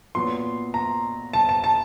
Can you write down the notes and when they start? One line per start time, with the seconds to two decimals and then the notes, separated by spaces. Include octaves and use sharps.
0.15 A#2 F#3 B3 C6
0.74 A#5
1.33 A5
1.49 A5
1.64 A5